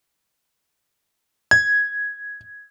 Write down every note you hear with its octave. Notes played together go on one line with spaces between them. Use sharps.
G#6